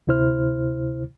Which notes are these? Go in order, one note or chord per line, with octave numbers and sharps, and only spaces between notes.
D2 C3 E4 C5 F6